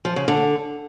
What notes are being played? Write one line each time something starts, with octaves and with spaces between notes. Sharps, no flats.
F3
C#3
D3